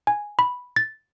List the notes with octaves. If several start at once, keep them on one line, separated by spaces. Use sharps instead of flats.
G#5
B5
A6